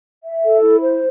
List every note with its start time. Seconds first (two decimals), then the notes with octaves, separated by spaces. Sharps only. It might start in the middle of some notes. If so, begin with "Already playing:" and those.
0.22 E5
0.42 A4
0.61 E4
0.80 C5